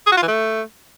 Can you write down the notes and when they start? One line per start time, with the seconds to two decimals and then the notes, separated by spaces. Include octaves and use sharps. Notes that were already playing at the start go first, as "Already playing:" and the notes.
0.07 G#4
0.12 F#4
0.17 F4
0.22 E3
0.28 A3